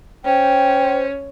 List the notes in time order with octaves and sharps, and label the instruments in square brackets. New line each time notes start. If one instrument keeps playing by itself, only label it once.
[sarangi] C#4 [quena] C5 [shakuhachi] G5